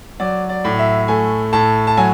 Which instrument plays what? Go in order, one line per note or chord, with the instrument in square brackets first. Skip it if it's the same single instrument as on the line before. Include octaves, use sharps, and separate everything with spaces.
[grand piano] F#3 D5
D5
A2
E5
A3 G#5
A2 A5
A5
F#3 G#5